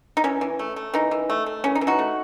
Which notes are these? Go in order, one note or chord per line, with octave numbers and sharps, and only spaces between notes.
D#4
E3 C#4
E3
A3
A3
E3 D#4
E3
A3
A3
E3 C#4
D#4
E3
D#4 F#4
A3